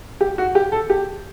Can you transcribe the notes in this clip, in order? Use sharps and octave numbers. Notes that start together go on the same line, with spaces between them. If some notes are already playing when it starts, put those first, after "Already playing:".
G4
F#4
G4
A4
G4